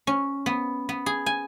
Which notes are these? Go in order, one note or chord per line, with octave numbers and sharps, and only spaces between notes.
C#4
B3
B3
G#4
G#5